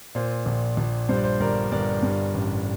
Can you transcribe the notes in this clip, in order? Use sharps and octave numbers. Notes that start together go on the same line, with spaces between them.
A#2 C5
A#1
A#1
G2 C5
D5
C5
G1 A#4 D5
G1 A#4 D5
G2
A1